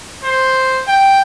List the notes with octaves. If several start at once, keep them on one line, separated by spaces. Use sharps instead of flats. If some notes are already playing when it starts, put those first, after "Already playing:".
C5
G5